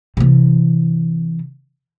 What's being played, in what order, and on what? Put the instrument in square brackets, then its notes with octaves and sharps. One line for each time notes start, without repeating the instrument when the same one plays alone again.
[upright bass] C3 E3